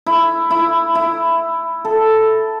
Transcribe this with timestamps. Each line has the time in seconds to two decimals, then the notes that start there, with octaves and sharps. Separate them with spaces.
0.06 E4
0.51 E4
0.95 E4
1.85 A4